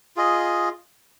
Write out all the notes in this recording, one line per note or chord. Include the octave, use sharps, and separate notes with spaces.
F4 G#4 D#5